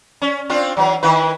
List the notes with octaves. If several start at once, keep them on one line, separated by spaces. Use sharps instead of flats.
C#4
C4 D4 F4
E3 F#3
D#3 E4 B4